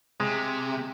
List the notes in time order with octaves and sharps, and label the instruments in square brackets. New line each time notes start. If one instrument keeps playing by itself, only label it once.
[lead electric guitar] C3 [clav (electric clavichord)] G#3